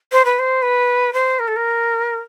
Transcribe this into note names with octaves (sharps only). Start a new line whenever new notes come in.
C5
B4
C5
B4
C5
A#4
A4
A#4